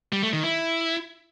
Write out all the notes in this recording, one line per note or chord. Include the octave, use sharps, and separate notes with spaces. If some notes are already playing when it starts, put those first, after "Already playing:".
G3
A3
D#3
E4